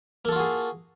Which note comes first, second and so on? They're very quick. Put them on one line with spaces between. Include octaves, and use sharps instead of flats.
A#3 A4 F4 F#4 G#4